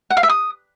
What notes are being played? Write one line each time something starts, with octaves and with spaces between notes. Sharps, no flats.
F#5
F5
E5
D#6